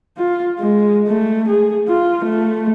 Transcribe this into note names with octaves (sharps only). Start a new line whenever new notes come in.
F4
G#3
A3
G#4
F4
A3